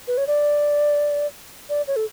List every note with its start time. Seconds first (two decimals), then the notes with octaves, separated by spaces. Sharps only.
0.08 B4
0.18 C#5
0.27 D5
1.69 D5
1.88 C#5
1.96 A4